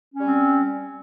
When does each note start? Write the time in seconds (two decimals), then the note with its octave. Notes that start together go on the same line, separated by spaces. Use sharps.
0.15 C#4
0.19 G3
0.24 C4